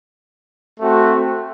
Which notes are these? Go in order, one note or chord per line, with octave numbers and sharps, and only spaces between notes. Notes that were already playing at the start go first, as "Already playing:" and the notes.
A3 C4 F#4